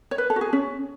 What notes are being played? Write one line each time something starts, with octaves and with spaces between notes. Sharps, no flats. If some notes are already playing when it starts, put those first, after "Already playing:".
C#5
B4
A4
F#4
G#4
C#4